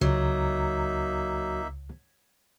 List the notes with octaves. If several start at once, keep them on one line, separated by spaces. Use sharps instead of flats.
C#2 F#3 A#3 D#4 E5